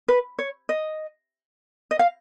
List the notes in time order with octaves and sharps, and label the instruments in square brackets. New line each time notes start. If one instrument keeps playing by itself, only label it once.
[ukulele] B4
C#5
D#5
D#5
F5